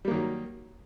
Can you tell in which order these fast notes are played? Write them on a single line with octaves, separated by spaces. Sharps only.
G3 A#3 D#3 F#3